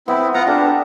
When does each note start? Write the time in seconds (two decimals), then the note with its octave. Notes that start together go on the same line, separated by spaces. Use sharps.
0.08 B3 C4 E4
0.34 B3 F4 F#5 A#5
0.47 D4 G4 A4